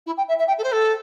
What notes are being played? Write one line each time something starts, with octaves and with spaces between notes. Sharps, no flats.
E4
G5
E5
E5
G5
A4
C5
A4